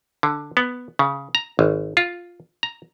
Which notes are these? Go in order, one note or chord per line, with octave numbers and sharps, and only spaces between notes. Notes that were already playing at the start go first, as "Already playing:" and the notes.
D3
B3
C#3
A#5
G#1
F4
A#5